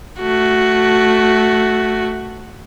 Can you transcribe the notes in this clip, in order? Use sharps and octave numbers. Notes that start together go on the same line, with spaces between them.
A3 F#4